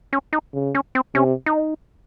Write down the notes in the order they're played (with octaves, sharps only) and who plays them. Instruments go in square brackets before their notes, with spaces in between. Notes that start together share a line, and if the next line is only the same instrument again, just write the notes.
[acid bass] C#4
D#4
[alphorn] C#3
[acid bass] C#4
C4
[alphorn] C3 [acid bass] C#4
[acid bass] D#4